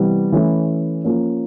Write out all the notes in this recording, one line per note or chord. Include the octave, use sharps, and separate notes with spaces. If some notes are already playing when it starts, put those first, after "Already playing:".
Already playing: C3 E3 G3 B3
E3 A3 C#4 E4
F3 A#3 C#4